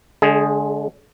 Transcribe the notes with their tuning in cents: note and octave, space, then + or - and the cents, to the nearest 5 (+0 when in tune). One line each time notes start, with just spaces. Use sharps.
D3 -20 G#3 +25 G#4 +0